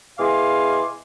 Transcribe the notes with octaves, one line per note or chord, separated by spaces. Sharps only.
B2 E4 G#4 F5 C6 D6